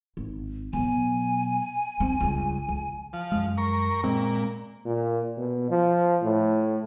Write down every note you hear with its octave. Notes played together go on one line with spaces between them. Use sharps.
G#1
B2 F#3 G#5
B1 C4
C#2 G2
C#2
F3
F#2 G#3
A#4 C#6
A#2 G#3 C4
A#2
B2
F3
A2